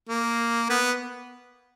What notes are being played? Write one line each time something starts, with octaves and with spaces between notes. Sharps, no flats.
A#3
B3